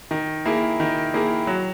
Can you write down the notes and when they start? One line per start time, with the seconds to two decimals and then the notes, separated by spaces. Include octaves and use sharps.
0.11 D#3
0.46 A#3 E4 G#4
0.80 D#3
1.14 A#3 E4 G#4
1.47 F#3